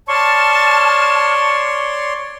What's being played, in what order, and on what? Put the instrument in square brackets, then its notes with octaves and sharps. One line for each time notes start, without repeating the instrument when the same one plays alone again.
[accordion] C#5 D5 C6 [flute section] A5 F6 [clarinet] C#6